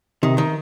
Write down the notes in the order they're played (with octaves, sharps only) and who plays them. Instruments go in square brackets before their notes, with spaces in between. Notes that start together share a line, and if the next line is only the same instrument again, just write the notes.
[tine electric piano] C3 [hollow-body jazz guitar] D#3
[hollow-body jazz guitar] D#3